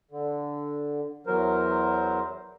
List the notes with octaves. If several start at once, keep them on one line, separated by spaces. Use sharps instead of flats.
D3
E2 E3 F#3 A#4 C5